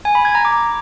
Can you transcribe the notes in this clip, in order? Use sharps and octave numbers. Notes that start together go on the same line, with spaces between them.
G#5
B5
G#6
A#5
D6